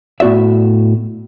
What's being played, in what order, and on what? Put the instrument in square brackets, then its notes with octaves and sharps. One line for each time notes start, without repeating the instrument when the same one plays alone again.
[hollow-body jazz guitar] A2 B3 F#4 D5 E5